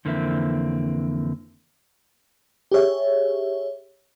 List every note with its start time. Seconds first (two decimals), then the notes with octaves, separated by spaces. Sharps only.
0.05 F2 D3 E3 A#3 C4 E5
2.72 G4 G#4 C#5 E5